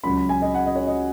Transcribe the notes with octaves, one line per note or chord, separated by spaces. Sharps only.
C#2 C#3 F#3 C#4 B5
B5
G#5
D#5
F#5
D#5
C#5
D#5